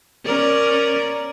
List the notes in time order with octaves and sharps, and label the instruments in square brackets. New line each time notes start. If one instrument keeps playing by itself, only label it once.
[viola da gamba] C#4 A#4 D5